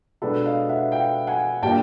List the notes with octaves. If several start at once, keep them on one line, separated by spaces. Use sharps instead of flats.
B2 G#3 B3 D4 A4 B4
D#5 F5
E5 F#5
F5 G5
F#5 G#5
A#2 G3 A#3 D4 G5 A5